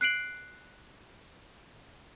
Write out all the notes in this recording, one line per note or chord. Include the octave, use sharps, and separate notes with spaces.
F#6 C7 D7 F#7